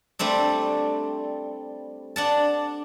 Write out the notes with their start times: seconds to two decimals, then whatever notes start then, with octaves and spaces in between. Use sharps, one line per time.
0.19 G3 A3 C4 D4
2.16 D4 F#5 A5